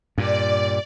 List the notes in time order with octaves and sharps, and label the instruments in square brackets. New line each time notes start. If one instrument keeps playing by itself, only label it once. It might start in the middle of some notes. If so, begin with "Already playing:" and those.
[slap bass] G2 A#2 [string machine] D5